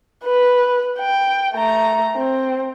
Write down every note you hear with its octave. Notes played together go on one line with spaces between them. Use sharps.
B4
G5
A3 A#5
C4